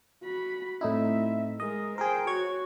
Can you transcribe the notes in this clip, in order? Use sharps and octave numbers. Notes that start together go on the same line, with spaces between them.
F#4 B5
A2 C4 D#4 E4 E5
G#3 A#4 D#5
G#4 A#4 C5 G5
F#4 C#5 G#6